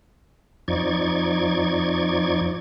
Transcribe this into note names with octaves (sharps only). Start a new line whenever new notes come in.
F2 F3 D#4 D5 C#6 G#6